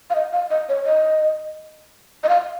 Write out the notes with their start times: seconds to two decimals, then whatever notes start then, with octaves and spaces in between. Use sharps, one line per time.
0.10 F5
0.15 D#5
0.33 F5
0.51 D#5
0.69 C#5
0.86 D#5
2.24 D#5
2.29 F5